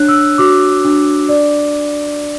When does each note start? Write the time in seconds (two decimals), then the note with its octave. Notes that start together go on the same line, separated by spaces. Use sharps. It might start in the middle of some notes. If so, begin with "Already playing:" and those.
Already playing: D4 C#5 F#6
0.08 E6
0.38 F#4 D6
0.85 D4
1.29 D5